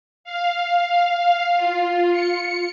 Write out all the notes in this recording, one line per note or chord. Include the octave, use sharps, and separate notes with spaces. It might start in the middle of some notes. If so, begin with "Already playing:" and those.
F5
F4
C#7